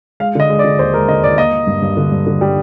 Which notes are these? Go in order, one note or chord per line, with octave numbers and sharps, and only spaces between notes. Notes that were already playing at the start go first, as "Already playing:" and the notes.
G#3 F5
D3 D#5
G#3
D5
D3
D#2 C5
G#3 A#4
D3 D#5
D#2 D5
A#3 D#5
A#3
G2
G2
D3
G2
D3
G3